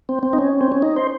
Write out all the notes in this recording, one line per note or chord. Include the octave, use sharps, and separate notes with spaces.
C4
C4
D#4
C#4
C4
C#4
D#4
C5